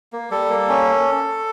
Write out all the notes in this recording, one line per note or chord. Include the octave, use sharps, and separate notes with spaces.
A#3
G3 A4
A#3
C#4